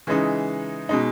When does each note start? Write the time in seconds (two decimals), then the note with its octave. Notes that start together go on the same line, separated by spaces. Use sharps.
0.07 C#3 E3 G#3 D#4
0.89 B2 G#3 D#4